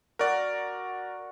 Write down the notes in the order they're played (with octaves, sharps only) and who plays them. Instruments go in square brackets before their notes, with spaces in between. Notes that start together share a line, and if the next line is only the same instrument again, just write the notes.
[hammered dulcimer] F#4 [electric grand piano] A#4 D5